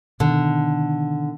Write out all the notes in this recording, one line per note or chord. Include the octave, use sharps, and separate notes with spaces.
B2 D3 D#3